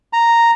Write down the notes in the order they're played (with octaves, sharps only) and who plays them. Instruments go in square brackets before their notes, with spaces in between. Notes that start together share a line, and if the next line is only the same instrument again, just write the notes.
[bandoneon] A#5